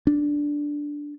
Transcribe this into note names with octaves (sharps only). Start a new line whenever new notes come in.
D4